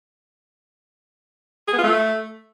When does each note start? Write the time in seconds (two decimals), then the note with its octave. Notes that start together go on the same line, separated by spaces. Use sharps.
1.68 G#4
1.73 B3
1.78 F4
1.83 A3